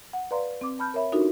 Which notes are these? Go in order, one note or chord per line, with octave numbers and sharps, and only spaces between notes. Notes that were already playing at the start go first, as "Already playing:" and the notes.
F#5
B4 D5 F5 A#5 C6
C4 D6
A5 B5 F6 G6
A#4 C#5 E5 B5
D4 D#4 F4 F#4 A4 A#4